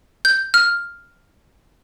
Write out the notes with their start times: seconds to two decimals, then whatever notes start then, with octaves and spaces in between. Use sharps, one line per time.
0.25 G6
0.54 F6